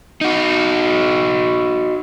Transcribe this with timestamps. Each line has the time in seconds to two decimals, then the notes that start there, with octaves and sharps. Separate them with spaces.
0.21 D#4 F#4